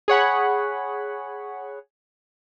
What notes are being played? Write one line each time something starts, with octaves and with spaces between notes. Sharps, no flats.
G#4 C#5 F#5 B5